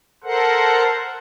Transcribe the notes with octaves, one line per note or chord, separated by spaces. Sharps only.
A4 A#4 C5 F#5